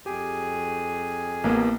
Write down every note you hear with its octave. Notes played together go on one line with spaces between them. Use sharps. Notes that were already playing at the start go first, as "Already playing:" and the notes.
F2 G4 G#4 G#5
A1 A#3 B3